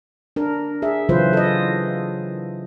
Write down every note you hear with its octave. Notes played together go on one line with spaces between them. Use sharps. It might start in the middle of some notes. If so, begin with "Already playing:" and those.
D4 A#4
G#4 E5
C#3 E3 F#3 F4 B4 C5
A4 D#5